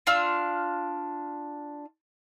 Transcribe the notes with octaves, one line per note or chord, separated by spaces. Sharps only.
D4 F4 F5 E6